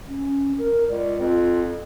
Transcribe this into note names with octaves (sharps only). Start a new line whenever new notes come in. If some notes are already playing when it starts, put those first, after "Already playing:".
C#4
A#4
C#2 D5
F2 F4